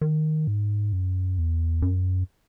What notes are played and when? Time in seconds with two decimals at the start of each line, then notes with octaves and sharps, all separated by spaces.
0.01 D#3
0.47 G#2
0.93 F#2
1.38 E2
1.82 F#2